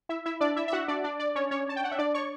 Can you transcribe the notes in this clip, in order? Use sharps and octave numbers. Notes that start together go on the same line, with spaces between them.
E4 E5
E4 E5
D4 D5
E4 E5
E5
F#4 F#5
D4 D5
D4 D5
D4 D5
C#4 C#5
C#4 C#5
A5
G5
F#5
E5
D4 D5
C#5 C#6